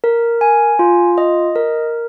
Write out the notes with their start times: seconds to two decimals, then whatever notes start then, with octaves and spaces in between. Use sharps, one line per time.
0.04 A#4
0.41 G#5
0.79 F4
1.18 D#5
1.56 A#4